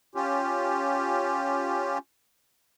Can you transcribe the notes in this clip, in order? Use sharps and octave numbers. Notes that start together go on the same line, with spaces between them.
C#4 F4 G4